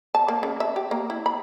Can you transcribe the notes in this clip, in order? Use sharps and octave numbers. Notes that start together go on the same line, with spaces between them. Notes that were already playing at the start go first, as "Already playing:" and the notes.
A5
A#3
C#3
E5
G4
A#3
E4
B5